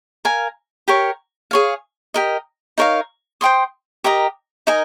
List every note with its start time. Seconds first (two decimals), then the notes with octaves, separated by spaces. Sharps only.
0.25 A#4 F5 G#5
0.88 G4 A#4 C#5
1.51 G#4 C#5 F5
2.14 G4 A#4 D#5
2.78 D#4 A#4 C#5 F5
3.41 C5 G5 C6 D#6
4.04 G4 A#4 D#5 A#5
4.67 D#4 A#4 D#5 G#5